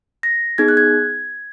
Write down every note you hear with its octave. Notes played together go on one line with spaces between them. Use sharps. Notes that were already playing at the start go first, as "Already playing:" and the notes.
A#6
B3 D#4 G#4 G#6
F#6
G#6